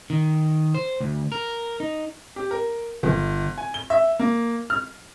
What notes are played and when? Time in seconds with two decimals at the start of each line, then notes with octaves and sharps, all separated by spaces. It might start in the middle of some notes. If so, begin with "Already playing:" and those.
0.10 D#3
0.75 C5
1.00 D2
1.32 A#4
1.80 D#4
2.36 G4
2.51 A#4
3.03 G1
3.58 G#5
3.74 G7
3.90 E5
4.19 A#3
4.70 F6